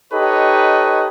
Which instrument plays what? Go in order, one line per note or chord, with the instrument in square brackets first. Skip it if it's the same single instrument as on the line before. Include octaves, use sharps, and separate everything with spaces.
[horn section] D#4 G4 A4 B4 C#5 D#5